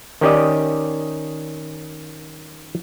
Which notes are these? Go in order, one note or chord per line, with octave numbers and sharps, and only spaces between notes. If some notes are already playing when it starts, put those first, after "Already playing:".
D#3 C#4 G4 D5 D#5